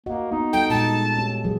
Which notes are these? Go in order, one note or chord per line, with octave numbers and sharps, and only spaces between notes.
A#3 F#4 D#5 F#5
B3 D#4
G3 A4 G5
A#2 G#3 A5
C#4 G4
E3 F#3 G#4